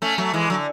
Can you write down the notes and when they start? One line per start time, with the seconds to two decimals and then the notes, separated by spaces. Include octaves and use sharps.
0.02 A3 C#4
0.18 F#3 A3
0.33 E3 G#3
0.50 D3 F#3